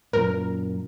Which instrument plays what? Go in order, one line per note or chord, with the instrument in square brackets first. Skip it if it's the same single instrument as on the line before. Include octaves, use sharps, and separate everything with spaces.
[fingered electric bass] F#2 A#2 [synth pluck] A#4